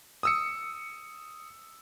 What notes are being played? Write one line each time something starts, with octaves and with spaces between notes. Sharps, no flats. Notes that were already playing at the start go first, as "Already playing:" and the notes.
D#6 E6 C#7